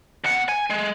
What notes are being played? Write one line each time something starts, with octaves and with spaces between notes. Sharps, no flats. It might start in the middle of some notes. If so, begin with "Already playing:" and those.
B2 F#5
G#5
G#3